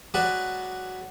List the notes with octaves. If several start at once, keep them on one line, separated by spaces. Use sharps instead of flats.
F#3 G#3 F#4 B4 D5